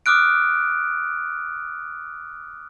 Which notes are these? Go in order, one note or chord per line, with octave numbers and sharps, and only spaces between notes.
D6 D#6 F6 F#6 D7